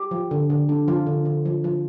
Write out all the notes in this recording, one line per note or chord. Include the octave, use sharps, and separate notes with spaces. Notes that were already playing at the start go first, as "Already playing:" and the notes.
Already playing: G4
F3
D3
D3
D4
F3 F4
D3
D3
F3
F3